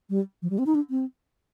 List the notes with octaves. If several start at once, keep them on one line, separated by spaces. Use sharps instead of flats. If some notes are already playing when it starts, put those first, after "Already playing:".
G3
F3
G3
C4
D#4
D4
C4